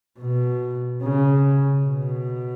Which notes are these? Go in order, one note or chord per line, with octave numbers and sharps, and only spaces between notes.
B2
C#3
B2